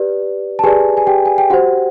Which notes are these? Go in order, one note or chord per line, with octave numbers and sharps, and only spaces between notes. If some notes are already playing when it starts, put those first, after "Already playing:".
Already playing: G4 B4 D5
A5
G4 G#4 B4 D5 G#5
G#5
G4 G5
G#5
G5
F#4 G4 C5 F#5